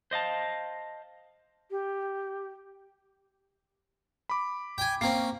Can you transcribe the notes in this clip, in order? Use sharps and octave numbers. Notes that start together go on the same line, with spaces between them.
C5 D#5 F5 A5
G4
B5 D6
G5 G#5
A#3 C4 C#4 C7